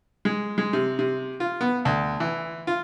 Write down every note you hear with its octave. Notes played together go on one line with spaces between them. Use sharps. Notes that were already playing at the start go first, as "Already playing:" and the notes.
G#3
G#3
C3
C3
F4
B3
D2
E3
F4